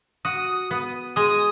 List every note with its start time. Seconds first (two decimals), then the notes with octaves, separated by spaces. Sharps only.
0.25 F#4 D#6
0.71 B3
1.16 G#3 D#6